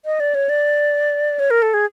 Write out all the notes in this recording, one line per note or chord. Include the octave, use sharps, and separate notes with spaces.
D#5
D5
C#5
D5
C#5
A#4
A4
G#4